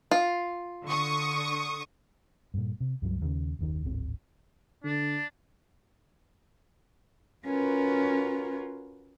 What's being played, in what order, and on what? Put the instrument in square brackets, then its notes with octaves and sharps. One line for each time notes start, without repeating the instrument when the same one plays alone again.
[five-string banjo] F4
[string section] D3 C#6 D#6
[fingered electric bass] G2 A#2
C3
C#2 G2 E3 F#3
D#2 C#3
F#1 D#2 D#3
D1 G#1 C4
[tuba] D3 [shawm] D4
[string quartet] C#4 F4 F#4 A#4 B4